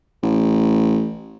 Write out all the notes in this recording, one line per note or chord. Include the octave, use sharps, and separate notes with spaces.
A1